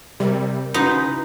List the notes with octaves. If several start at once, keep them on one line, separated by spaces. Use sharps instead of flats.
C3 G3 A#4
C#3 D#4 E4 F#4 B4 C5